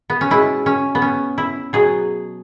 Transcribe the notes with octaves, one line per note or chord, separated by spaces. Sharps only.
B3
C#4
B2 G#3 E4
C#4
B3
C#4
E4
B2 F#3 G#4